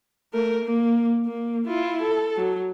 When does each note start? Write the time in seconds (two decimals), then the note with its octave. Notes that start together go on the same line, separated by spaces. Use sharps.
0.33 A3 A#4
0.64 A#3
1.26 A#3
1.67 E4 F4
2.02 A4
2.36 F#3